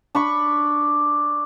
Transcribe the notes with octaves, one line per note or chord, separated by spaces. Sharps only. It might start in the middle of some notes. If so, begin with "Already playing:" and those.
D4 B5 C#6